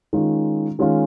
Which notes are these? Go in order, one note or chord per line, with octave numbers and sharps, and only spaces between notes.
D#3 G#3 C#4 F4
D#3 G#3 C#4 F4